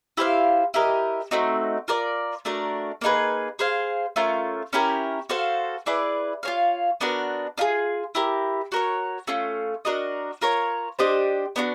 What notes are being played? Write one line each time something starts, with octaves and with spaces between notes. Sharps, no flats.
E4 G4 C5 F5
E4 G4 A#4 D#5
A3 C4 D#4 F#4
F4 A#4 D5
A3 D4 F#4 A#4
A#3 D#4 G#4 B4
G#4 C5 F5
A3 C#4 F4 A#4
C#4 E4 G4 A#4
F#4 A4 C5 F5
E4 G#4 B4 D5
F4 G#4 C#5 F5
B3 D4 F#4 A#4
D4 F4 G#4
E4 G4 A#4
F#4 A#4 C#5
A3 C#4 F4
D4 F#4 A#4 D#5
F4 A#4 C#5
D4 G4 C5 D#5
B3 D4 F#4